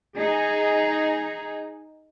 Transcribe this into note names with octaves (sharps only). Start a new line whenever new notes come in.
D#4 G#4